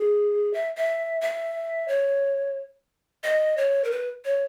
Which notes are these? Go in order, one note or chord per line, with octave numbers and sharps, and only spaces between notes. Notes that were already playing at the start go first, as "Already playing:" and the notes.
Already playing: G#4
E5
E5
E5
C#5
D#5
C#5
A#4
B4
C#5